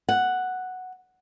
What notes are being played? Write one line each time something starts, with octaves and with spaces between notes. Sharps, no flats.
F#5